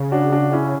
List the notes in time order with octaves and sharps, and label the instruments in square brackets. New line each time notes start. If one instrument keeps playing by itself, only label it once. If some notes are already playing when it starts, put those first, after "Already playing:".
Already playing: [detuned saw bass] C#3
[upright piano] D4 F#4
D4 F#4
C#4 E4